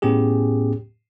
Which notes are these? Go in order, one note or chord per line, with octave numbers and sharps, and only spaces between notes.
A2 B3 C#4 G4 G#4